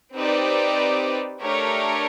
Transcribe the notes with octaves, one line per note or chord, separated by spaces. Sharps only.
C4 D#4 G4 B4 D5
A3 D4 G4 A#4 C#5